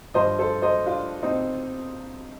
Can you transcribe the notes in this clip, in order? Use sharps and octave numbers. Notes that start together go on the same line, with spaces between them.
G2 F3 C5 D#5
A4 C5
C5 D#5
D4 F4
C4 D#4